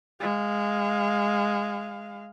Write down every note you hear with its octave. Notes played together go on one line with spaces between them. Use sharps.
G#3 F5